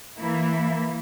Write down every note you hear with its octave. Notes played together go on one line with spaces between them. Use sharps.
E3 A#3 E4